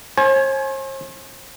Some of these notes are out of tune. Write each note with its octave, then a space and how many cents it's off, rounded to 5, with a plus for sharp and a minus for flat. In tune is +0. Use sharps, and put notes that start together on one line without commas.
C5 +45 G#5 +25